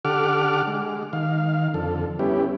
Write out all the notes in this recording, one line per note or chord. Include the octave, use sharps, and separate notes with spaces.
D3 G4 A4 F#5 D6 F6
G#3
D#3 F5
F2 D3 A4
G3 B3 C#4 E4 G4